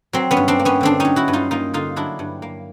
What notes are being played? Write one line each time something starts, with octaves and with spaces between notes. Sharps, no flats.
F#3 C4
B3 C#4
G2
C4 D4
A#3
B3 C#4
D3 C4 D4
F#3 C#4 D#4
E4 F#4
G2
D#4 F4
A#3 D#4 F4
D3 D#4 F4
F#3 D4 E4
G2
A#3